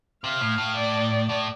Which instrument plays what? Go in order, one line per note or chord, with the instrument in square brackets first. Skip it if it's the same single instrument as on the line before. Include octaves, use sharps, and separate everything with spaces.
[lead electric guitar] C3 [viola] F5
[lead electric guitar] A2
A2
[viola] D5
[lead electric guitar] A2